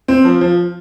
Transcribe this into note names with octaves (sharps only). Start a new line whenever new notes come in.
C4
F3
F3